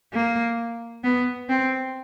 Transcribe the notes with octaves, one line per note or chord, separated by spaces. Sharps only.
A#3
B3
C4